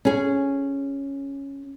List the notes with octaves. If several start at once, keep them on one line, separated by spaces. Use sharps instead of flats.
C#4 G#4